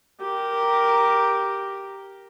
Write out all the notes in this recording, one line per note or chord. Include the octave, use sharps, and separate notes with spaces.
G4 A#4